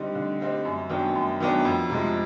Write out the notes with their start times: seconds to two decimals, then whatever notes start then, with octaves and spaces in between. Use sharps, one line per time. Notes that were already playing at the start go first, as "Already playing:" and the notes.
Already playing: D3 G3 C4 D#4
0.15 D3
0.40 G3 C4 D#4
0.65 F#2
0.90 D#3 F#3 B3 D4
1.15 F#2
1.40 D#3 F#3 B3 D4
1.65 F2
1.90 C3 F3 G#3